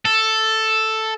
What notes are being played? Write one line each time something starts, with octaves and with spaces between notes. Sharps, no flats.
A4